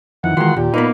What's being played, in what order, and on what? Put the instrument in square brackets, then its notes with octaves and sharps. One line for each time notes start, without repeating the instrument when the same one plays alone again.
[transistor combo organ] F2 D#3 E3 [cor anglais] F#5
[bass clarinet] D#3 [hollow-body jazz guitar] E3 G#3 [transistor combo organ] F4 F#4 C6
[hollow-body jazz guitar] D#2 [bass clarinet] A#2 [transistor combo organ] G4
[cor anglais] A#3 [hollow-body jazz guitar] B3 D#4 [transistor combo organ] B4